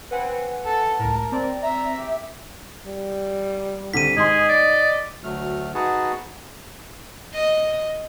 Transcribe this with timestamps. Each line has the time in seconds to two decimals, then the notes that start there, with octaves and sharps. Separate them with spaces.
0.11 C4 B4 F#5 G#5
0.65 A4 A5
0.99 C#2 A2 A#4
1.32 C4 D5
1.63 E5 A#5
1.97 G4
2.86 G3
3.94 C2 D3 B6 D#7
4.17 G#2 G#4 D#5 C6
4.49 D5
5.24 D2 F#3 A3 F6
5.75 D#4 F#4 G#4 B4 F#5 A5
7.34 D#5